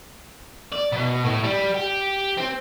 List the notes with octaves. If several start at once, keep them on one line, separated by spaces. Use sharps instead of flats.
D5
B2
A2
G3
G4
C4